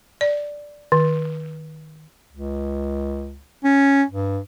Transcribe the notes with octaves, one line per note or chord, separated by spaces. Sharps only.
D5
D#3
C#2
C#4
G2